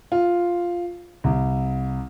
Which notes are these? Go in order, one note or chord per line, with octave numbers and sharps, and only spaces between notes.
F4
C2